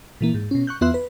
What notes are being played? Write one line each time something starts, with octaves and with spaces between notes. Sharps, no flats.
A#2 E3 A#3
G#2
B2 C#4
C#6 F#6 G6
E2 B3 F4 E5 C6 F#6
B4